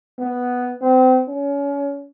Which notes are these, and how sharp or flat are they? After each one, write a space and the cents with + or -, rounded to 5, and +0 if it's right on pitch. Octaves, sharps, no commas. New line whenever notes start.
B3 +0
C4 -30
C#4 +30